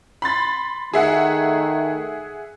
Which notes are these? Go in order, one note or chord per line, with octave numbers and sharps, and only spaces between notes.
B5 C6 A6
D#3 A3 G#4 E5 F#5